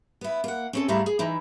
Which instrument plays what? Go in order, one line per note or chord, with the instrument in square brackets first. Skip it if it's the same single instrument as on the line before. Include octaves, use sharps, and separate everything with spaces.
[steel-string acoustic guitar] B3 E4
A#3 F#5
C4 C#4 A4
G#2 G3 A3 E4 F5 A#5
G#4
E3 D#4 E4